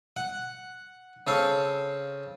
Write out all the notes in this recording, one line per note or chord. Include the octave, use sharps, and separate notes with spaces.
F#5
C#3 C4 A4 F5